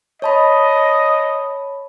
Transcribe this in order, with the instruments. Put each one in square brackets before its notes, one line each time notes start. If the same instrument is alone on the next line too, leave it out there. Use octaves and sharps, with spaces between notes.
[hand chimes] C#5 A5 B5 [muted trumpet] D#5